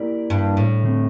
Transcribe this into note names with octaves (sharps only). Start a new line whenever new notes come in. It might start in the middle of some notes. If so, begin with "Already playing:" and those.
Already playing: A#3 E4 G4 A#4 D5
G2
A2
D3 A3 C4